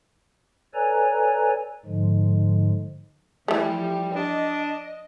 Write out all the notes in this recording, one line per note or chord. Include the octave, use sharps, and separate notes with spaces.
A4 B4 C#5 D5 G#5 A#5
G#2 D3 F3 G#3
E3 F3 G3 A3
D4 D#5